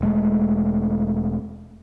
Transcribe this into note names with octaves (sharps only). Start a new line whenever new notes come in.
E1 G#3 A3